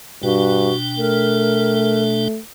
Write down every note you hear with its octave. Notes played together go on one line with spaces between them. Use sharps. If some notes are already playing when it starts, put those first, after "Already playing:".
G2 B2 D4 F#4 G5
A3 A#4